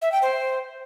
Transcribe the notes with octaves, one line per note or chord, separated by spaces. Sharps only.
E5
G5
C5